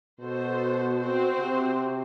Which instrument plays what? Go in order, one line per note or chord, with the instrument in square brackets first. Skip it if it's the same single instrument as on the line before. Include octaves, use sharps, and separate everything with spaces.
[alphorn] B2 [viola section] B3 F#4 A4 C5
[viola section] C4 F#4 C5
[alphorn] C3